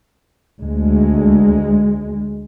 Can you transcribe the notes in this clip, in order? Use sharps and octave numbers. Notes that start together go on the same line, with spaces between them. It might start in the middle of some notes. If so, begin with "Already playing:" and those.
D2 G#3